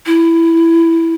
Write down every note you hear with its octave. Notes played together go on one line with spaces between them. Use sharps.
E4